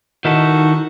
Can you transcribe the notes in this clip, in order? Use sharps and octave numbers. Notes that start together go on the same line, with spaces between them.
D#3 D#4 E4 F#4 A4